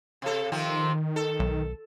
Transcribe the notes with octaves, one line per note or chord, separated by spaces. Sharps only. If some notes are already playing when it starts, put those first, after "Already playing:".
C3 A4
C3 D#3 F3 C4
A4
B1